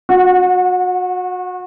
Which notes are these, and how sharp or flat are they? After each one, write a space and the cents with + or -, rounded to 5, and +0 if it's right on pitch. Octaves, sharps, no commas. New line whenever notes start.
F#4 -30 F#5 +0